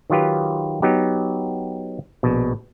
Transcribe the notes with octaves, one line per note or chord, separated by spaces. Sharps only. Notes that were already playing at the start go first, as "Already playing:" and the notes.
D#3 F#3 F4 G4 B4
F#3 B3 D#4 G4
A#1 B2